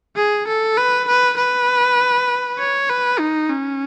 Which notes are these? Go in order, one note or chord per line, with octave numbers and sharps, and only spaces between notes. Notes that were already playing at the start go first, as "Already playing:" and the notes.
G#4
A4
B4
B4
B4
C#5
B4
D#4
C#4